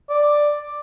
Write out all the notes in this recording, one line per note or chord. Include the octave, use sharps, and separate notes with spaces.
D5